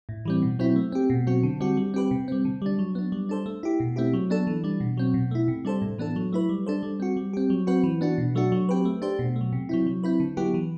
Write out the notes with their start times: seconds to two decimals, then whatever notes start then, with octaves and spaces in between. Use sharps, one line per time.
0.09 A2
0.25 E3 G3 C4
0.42 B2
0.59 F#3 C4 E4
0.76 A3
0.92 C4 G4
1.10 B2
1.27 F#3 C4 F#4
1.43 D3
1.60 G3 C4 F#4
1.77 G3
1.94 C4 G4 B4
2.11 C3
2.28 G3 C4
2.45 D3
2.62 G3 D4
2.79 F#3
2.95 B3 D4
3.12 G3
3.29 D4 A4 C5
3.46 A3
3.63 E4 G4
3.80 B2
3.96 A3 C4 E4 G4
4.13 F#3
4.30 B3 D4 A4
4.47 E3
4.64 G3 D4
4.80 B2
4.97 F#3 C4
5.14 B2
5.31 A3 E4
5.48 C3
5.65 G3 D4 A4 C5
5.81 A2
5.98 E3 B3 D4 A4
6.16 F#3
6.33 A3 E4 B4
6.49 G3
6.66 D4 A4 C5
6.83 G3
7.00 C4 F#4
7.17 G3
7.33 C4 G4
7.50 F#3
7.67 C4 F#4 B4
7.84 E3
8.01 B3 D4 F#4
8.18 B2
8.35 F#3 A3 D4 F#4
8.52 F#3
8.69 C4 G4 B4
8.85 A3
9.02 D4 G4 C5
9.19 B2
9.36 A3
9.41 F#3
9.53 C3
9.69 F#3 C4 E4
9.86 F#3
10.03 C4 E4 B4
10.20 D3
10.37 F#3 B3 E4 G4
10.54 E3